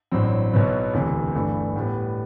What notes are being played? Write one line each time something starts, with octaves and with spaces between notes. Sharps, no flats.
A1 G2 F#3 C4
B1 B2 F#3 B3
E1 D2 C3 E3
G1 G2 E3 A3
A2 G3 B3